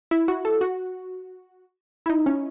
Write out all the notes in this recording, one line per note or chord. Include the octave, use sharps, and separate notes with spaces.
E4
F#4
A4
F#4
E4
D#4
C#4